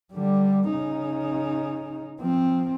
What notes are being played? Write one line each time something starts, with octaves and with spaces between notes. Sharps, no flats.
D3 G3
C#3 D#4
F3 C4